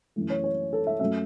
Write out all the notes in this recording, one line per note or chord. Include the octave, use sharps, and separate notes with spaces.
F#2 E3 A3
C#5
C#5
A4
E5
F#2 F#3 A3 E5